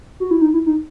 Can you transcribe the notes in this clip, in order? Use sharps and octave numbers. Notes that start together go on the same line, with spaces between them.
F#4
E4
D#4
E4
D#4